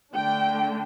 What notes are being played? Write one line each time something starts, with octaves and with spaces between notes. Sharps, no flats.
D3 A3 D4 G5